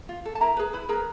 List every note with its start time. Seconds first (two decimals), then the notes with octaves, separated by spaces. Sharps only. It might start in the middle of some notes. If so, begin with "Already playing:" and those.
0.09 F4
0.25 A4
0.35 A5
0.41 E4 A#4 A#5
0.57 G#4 B4
0.73 E4 B4 B5
0.89 G#4 A#4 B4 A#5